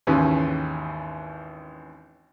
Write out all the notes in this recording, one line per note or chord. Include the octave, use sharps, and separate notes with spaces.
G#1 D#2 C#3 E3 G#3 C#4